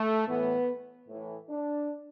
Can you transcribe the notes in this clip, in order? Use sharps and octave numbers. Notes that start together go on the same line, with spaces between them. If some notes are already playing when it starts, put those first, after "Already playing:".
Already playing: A3
A2 E3 B3
A2 E3
D4